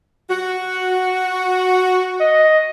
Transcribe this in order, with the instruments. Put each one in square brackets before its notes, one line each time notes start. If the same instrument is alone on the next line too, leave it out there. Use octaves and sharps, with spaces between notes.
[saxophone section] F#4
[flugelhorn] D#5